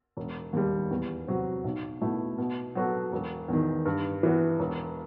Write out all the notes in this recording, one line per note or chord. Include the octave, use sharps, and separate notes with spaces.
E1
D#2 D#3 G3
E2
C3 F#3 C4 F#4
B1
B2 A3 E4
B2
F#3 B3 F#4 A4
E1
E2 D#3
G2
E3 B3
E1